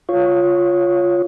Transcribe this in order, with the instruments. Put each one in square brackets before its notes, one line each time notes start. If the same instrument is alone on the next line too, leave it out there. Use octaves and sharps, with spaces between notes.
[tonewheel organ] F4 C#5